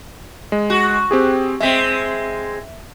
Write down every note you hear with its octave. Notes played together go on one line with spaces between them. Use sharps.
G#3
F#4
C4 G4 G#4
G#3 C4 E5 B6